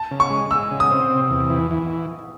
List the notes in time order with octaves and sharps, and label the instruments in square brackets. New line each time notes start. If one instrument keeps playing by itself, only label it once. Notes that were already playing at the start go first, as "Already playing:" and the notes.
Already playing: [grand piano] A5
[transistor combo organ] C#3
[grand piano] C#6
[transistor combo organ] G#3
[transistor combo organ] G#3 [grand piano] E6
[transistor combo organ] C#3
[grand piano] D#6
[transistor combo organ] C4
C3
E2
E3
E3